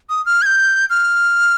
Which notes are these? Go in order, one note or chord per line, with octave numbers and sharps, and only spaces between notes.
D#6
F6
G#6
G6
F6